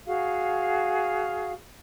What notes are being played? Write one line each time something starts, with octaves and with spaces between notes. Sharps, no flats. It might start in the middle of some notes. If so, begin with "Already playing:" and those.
F#4 G#4 F5